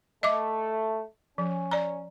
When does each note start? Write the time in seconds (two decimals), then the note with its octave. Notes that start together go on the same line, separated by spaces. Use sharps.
0.23 A3 D#5 E5 D6
1.38 F3 C#4
1.71 D5 A#5